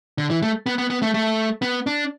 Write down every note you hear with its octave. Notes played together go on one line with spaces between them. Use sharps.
D3
E3
A3
B3
B3
B3
A3
A3
B3
D4